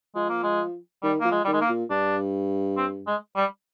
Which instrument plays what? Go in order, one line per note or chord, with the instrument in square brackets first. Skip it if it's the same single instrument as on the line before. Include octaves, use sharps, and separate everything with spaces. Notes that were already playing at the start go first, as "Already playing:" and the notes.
[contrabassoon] F3 [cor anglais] G#3
[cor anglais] A#3
G#3
[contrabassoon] D#3 [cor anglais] G3
[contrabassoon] F3 [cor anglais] A#3
[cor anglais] G#3
[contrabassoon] D#3 [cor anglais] G3
[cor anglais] G#3
A#3
[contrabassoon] A#2
[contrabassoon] G2 [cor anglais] D4
[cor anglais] C4
G#3
G3